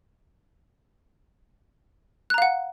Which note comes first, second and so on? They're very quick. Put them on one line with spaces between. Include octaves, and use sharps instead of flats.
F#6 A#5 F5 F#5